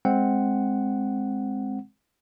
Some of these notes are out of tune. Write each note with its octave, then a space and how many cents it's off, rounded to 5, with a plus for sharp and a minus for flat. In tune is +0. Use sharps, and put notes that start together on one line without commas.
G#3 +0 C4 +0 F#5 +0